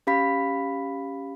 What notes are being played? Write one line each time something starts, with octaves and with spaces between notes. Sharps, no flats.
C#4 G4 F5 B5 B6